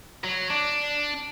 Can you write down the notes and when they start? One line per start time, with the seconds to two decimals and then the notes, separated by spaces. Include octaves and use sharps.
0.24 F#3
0.50 D4